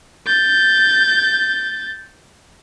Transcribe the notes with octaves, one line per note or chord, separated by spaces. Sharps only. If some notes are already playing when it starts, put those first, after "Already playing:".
G6 A6